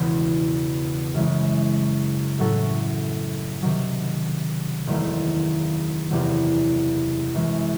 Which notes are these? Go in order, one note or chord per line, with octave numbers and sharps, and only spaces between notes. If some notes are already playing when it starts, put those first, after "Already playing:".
Already playing: E1 E2 C#3
F#2 C#3 E3 G#3
A2 F#3 C#4 F#4 A4
C3 D#3 F#3
F#1 E2 D#3 F#3 A3
F#1 E2 C3 F#3
F#2 E3 G#3